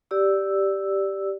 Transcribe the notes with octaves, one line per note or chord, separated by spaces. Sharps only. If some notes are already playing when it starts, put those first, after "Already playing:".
G4 D5 E6